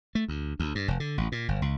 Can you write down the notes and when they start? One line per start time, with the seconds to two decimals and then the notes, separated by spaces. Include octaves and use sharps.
0.15 A3
0.28 D2
0.60 D2
0.75 G2
0.88 F1
1.00 D3
1.18 A1
1.32 A#2
1.48 G1
1.62 C#2